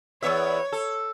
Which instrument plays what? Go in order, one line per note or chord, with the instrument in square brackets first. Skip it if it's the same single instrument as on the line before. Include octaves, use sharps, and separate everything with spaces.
[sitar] E2 B3 E5 [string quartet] C#5
[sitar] A4